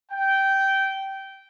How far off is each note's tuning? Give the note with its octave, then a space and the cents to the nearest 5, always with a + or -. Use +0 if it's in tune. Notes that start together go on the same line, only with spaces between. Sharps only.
G5 -15